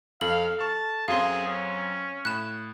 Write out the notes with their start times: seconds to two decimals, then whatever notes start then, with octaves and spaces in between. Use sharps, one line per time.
0.21 F2 A4 F5 F#7
0.59 A5 C#6 F6
1.08 F#2 F#3 C4 G#4 F5 C6
1.47 C#4
2.25 A2 B5 F#6 E7